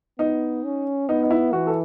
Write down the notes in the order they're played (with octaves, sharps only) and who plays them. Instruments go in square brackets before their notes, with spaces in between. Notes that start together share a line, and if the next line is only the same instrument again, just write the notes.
[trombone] B3 [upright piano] D#4
[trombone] C#4
[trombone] B3 [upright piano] D#4
[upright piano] D#4
E4
[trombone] E3 [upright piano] F#4
[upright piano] A4